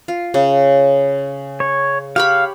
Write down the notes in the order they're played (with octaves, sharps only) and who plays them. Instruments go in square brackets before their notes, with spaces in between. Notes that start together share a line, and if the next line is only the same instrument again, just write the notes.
[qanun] F4
C#3
[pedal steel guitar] C#5
[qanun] G4 C#5 B5 [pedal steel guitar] F5